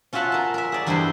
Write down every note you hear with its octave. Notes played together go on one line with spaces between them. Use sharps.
C#4 F4 F#4 E5 F#5 A5
A#4 A5
A#4 E5
G#4 D5
E2 G2 E4 C5 D#5 C6